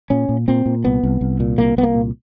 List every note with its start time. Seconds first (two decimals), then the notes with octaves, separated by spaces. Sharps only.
0.10 A#2 C#4
0.29 A#2
0.48 A#2 C4
0.66 A#2
0.84 C2 B3
1.03 C2
1.21 C2
1.40 A#2
1.58 C2 A#3
1.76 C2 B3
1.83 A#3
1.94 A#2